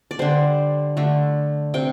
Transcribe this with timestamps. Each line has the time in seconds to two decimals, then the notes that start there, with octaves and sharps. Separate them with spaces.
0.11 D5
0.19 D3 G3 C5
0.97 D3 A3
1.74 C3 G5